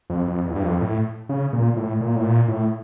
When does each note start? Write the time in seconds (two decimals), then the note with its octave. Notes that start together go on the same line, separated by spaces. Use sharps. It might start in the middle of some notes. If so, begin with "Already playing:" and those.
0.10 F2
0.28 F2
0.46 E2
0.56 G2
0.63 F2
0.81 A2
1.29 C#3
1.53 A#2
1.77 A2
2.01 A#2
2.16 A2
2.24 A#2
2.48 A2